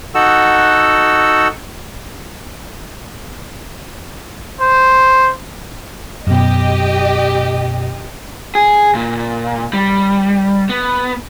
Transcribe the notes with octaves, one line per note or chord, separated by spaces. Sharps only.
D#4 F#4 A4 F#5 E6
C5
F#2 B2 G4 D#5
G#4
A#2
G3
B3